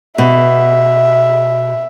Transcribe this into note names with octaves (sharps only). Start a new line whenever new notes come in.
B2 E5